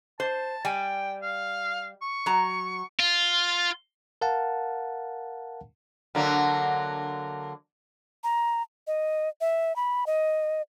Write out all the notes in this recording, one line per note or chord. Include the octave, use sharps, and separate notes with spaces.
C5 A5
G3 G5 G#5
F5
C#6
F#3 A#5
F4
A#4 F5 F#5 A5
D3 F#3 A#3
A#5
D#5
E5
B5
D#5